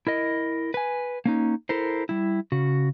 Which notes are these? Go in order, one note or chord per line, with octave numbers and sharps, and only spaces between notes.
E4 A#4 D#5
B4 G#5
A#3 C#4 D#4
E4 A4 A#4 C5
G3 E4
C#3 C#4 F#4